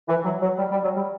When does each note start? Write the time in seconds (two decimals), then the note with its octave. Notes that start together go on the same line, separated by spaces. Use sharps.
0.09 E3
0.25 F#3
0.42 F#3
0.58 G3
0.71 G3
0.83 F#3
0.96 G3